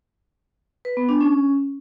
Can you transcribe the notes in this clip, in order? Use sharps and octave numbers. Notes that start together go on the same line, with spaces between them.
B4
B3
D4
C#4